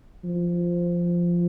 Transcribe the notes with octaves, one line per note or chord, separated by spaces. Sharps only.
F3